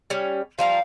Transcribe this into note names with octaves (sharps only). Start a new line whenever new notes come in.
G3 C#4
F3 G3 F5 A#5